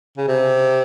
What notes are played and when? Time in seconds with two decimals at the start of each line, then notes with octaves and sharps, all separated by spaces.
0.18 C#3
0.28 C3